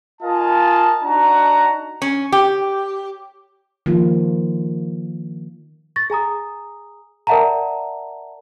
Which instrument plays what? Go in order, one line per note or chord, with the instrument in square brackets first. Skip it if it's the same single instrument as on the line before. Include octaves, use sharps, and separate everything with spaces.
[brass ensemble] F4 A#4 D#5 F5 G#5 A5
D4 D#4 F#4 F#5 A5 A#5
[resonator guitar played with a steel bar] C#4
G4
[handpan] D#3 F3 A#3 F4
[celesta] C#6 A6 A#6
G#4 G#5 A#5 D#6
A#4 D5 E5 F#5 A5 A#5